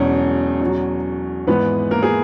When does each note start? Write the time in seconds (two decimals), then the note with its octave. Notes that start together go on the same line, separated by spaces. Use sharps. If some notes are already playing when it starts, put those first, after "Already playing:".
Already playing: E1 E2 B2 F#3 C#4
0.61 E2 B2 F#3
1.47 G#1 G#2 E3 G#3 B3 B4
1.91 A#3 A#4
2.03 G#4